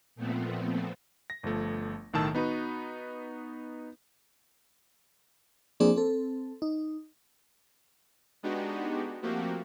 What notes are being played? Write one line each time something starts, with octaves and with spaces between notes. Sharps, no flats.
A#2 F3 A3 B3 C4
A#6
G1 F3 A3
B1 A2 D#3 A5 E6
B3 D#4 F#4 B4
F3 A#3 C4 D4 G#4 D5
C4 A4
D#4
G#3 B3 D4 D#4 F#4 G4
F3 A3 A#3 C4 F#4 G4